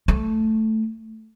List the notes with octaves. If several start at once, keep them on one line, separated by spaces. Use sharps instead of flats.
A3